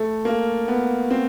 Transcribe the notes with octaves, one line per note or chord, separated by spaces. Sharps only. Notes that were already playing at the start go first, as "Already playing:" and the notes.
Already playing: A3
A#3
B3
C4